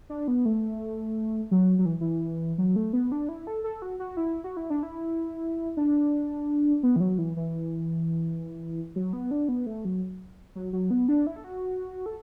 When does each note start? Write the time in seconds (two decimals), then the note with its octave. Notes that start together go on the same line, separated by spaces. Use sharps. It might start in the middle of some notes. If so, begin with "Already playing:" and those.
0.10 D4
0.28 B3
0.45 A3
1.51 F#3
1.79 F#3
1.86 E3
2.01 E3
2.58 F#3
2.76 A3
2.93 B3
3.12 D4
3.29 E4
3.47 A4
3.64 A4
3.82 F#4
4.00 F#4
4.17 E4
4.44 F#4
4.57 E4
4.70 D4
4.83 E4
5.77 D4
6.83 B3
6.96 E3
7.00 F#3
7.18 E3
7.36 E3
8.96 F#3
9.13 B3
9.31 D4
9.49 B3
9.66 A3
9.85 F#3
10.55 F#3
10.73 F#3
10.91 B3
11.08 D4
11.27 E4
11.36 A4
11.44 F#4
12.06 A4